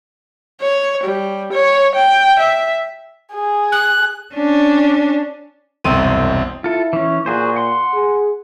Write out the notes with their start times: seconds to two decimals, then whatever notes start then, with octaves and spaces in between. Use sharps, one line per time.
0.62 C#5
1.04 G3
1.53 C#5
1.95 G5
2.39 E5
3.33 G#4
3.72 F#6
4.34 C#4 D4
5.84 E1 C2 F#2 C4 D#7
6.64 E4 F4 A4
6.93 E3 C#4
7.26 A#2 F#4 G#4 C5
7.56 F#5 C6
7.94 G#4